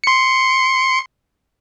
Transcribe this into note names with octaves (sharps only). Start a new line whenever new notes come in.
C6 C#7